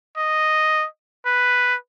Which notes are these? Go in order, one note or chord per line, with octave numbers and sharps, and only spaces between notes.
D#5
B4